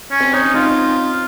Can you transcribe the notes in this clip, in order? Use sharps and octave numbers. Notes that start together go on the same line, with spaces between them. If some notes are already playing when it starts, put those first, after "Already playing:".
C#4
C4
C#4 D#4
C4 D#4 F4